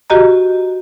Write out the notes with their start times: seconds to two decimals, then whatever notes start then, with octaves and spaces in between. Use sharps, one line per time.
0.10 F#4 G4 D#5 A#5